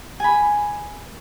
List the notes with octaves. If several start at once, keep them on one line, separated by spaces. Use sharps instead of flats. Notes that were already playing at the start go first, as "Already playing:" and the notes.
G#5 B5